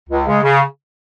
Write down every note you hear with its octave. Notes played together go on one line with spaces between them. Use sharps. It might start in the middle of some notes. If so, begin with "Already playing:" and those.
C#2
C#3 G#3
C#3